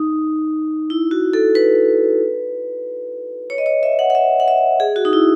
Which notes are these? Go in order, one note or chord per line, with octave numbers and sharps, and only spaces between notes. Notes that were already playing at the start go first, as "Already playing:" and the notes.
Already playing: D#4
E4
F#4
A4
B4
C#5
D#5
C#5
E5
F#5
F#5
E5
F#5
E5
G#4
F#4
D#4
E4